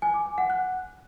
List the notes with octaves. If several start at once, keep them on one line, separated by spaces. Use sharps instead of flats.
G#5
D6
G#5
F#5
F#6